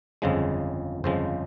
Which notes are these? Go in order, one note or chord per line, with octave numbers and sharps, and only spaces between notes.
G1 F2 C#3 F3 G#3
G1 F2 C#3 F3 G#3 C5